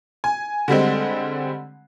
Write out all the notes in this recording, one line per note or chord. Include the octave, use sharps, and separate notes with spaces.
G#5
D3 G3 G#3 C4